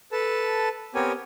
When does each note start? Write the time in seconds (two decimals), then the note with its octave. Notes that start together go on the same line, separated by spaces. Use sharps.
0.12 A4 B4 A5
0.95 B3 C4 G4 A#4 C#5 G#5